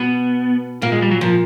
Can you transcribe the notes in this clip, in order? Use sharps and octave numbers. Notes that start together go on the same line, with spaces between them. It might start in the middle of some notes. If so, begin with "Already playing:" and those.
Already playing: B2 B3
A#2 A#3
G#3
G3
F#3
A#2 F3